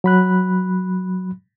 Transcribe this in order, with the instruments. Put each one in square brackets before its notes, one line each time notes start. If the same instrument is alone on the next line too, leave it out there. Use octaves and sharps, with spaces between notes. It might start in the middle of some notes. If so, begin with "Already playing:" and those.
[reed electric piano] F#3 B5 F#6